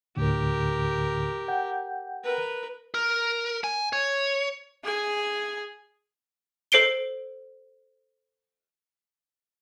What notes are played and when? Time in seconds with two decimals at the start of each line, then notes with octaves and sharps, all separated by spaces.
0.17 D2 A2 D3 G4 A#4
1.48 F#5 G5 G6
2.24 A#4 B4
2.94 A#4
3.64 G#5
3.93 C#5
4.83 G#4 G#5
6.72 A4 C5 C7 D7 G7